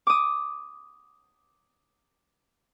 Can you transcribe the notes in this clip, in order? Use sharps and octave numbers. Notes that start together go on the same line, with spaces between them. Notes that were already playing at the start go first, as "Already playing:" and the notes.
D6 D#6